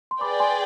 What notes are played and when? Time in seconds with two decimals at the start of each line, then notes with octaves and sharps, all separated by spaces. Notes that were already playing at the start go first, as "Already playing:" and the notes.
0.11 C6
0.21 G#4 B4 D5 G5 B5 D6
0.40 G#5 C6